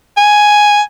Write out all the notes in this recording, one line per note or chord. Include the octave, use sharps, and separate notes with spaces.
G#5